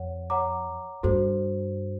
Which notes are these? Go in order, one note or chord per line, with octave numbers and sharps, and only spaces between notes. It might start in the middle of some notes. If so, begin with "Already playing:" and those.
Already playing: F2 C#5 F#5
C#5 F#5 A#5 D6
G2 F#4 A4 C5